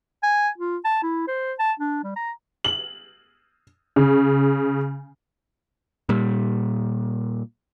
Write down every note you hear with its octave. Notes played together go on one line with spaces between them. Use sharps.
G#5
F4
A5
E4
C5
A5
D4
G3
A#5
F#7
C#3
A#2 G3